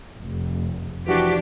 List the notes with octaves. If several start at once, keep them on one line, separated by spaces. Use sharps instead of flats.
F1
E3 F3 D4 F#4 G4